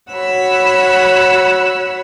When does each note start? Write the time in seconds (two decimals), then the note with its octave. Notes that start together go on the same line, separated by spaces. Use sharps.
0.13 F#4 C#5 F#5 B5 E6